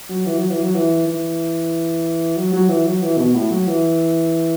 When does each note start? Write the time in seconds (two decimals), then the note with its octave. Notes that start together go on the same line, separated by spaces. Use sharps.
0.10 F#3
0.26 E3
0.37 F#3
0.50 E3
0.62 F#3
0.75 E3
1.07 E3
2.37 F#3
2.53 F#3
2.69 E3
2.86 F#3
3.02 E3
3.18 B2
3.35 A2
3.51 F#3
3.68 E3